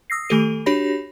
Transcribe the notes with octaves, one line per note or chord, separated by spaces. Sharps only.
D#6 E6 A#6 C7
D#3 A3 G4 A4 D#7
D4 F#4 G4 C#5 B5 A#6